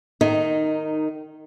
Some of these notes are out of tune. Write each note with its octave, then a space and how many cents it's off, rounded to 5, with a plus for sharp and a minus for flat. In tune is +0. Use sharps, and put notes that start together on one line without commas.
D#3 -15 D#4 +0